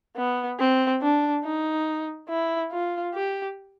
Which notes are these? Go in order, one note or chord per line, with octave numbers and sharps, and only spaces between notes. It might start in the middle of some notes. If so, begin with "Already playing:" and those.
B3
C4
D4
D#4
E4
F4
G4